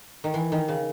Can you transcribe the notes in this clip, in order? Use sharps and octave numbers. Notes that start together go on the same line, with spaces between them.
D#3
E3
D#3
C#3